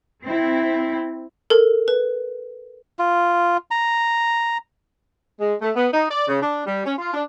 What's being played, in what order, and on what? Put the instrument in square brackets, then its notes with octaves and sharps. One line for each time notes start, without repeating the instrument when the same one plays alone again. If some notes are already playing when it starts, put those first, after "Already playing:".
[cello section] C4 E4
[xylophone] A4 A#4
B4
[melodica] F4
A#5
[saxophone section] G#3
A3
B3
D#4
D5
C#3
D4
G3
C#4
F4
D4